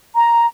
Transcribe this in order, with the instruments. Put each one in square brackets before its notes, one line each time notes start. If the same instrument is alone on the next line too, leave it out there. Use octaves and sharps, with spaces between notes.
[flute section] A#5